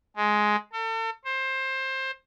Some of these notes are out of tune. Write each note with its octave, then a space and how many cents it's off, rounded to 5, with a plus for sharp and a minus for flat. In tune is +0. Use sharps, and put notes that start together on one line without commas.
G#3 +10
A4 +40
C5 +20